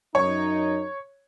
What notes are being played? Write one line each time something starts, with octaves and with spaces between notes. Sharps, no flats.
F#2 D#4 C#5 C#6